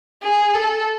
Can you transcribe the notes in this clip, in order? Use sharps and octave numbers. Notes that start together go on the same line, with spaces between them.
G#4
A4